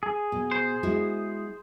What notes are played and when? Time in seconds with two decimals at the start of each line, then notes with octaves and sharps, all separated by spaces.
0.03 G#4
0.32 B2
0.51 C5
0.83 G#3 E4 F#4